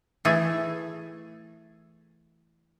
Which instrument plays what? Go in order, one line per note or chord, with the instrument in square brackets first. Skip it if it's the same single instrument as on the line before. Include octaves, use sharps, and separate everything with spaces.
[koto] E3 A3 G#4 A4